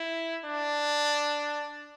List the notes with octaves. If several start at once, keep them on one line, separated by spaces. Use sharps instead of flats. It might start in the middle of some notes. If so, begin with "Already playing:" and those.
Already playing: E4
D4